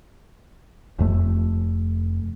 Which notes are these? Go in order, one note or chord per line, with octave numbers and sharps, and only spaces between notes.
F1 F2 A3